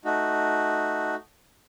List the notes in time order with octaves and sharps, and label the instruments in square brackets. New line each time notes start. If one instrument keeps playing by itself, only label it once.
[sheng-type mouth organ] A3 D#4 F#4